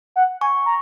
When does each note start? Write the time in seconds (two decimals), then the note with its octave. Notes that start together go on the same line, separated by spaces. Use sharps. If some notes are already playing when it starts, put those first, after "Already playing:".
0.16 F#5
0.41 G#5 C#6
0.66 A#5